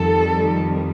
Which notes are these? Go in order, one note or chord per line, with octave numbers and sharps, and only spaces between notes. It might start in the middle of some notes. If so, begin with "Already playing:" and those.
Already playing: F2 D#3 G3 A4